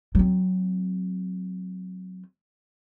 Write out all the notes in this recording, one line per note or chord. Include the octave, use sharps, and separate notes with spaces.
F#3 C4